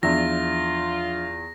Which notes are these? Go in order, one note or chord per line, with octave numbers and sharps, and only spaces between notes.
E2 F3 D4 F4 E5 A#6